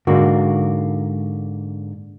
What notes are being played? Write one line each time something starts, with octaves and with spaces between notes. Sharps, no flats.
G#2 D3 A#3 F#4